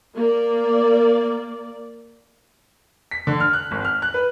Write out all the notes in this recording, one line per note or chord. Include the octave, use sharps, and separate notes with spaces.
A#3 D5
B6
D3
F6
F#6
G#1
F6
F#6
B4